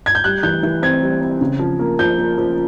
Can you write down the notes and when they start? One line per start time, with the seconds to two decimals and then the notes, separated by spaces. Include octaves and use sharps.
0.06 G#6
0.15 G6
0.24 G3 F#6
0.43 E3 G6
0.63 E3
0.82 C4 G#6
1.02 G3
1.21 C4
1.41 C#3
1.59 F3
1.79 A#3
1.99 F3 G6
2.18 A#3
2.38 F3